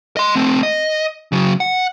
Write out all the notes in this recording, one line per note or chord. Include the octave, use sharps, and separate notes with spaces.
D#5 C6
A3 C4
D#5
C#3 F#3
F#5